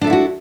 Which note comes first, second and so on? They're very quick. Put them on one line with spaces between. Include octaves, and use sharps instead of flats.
D4 A4 E5 E4 F#4